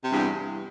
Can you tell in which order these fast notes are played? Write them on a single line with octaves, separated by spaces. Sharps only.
C3 G2 E2